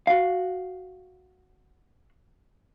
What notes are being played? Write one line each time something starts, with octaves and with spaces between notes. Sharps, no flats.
F#4 F5